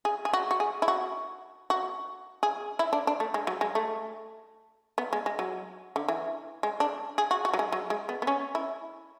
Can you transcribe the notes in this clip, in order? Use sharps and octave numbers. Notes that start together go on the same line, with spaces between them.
G#4
G#4
F#4
F#4
G#4
E4
F#4
F#4
G#4
E4
D4
D4
A3
G#3
F#3
G#3
A3
B3
G#3
G#3
F#3
D3
E3
G#3
D4
G#4
F#4
F#4
F#3
G#3
F#3
G#3
B3
B3
C#4
E4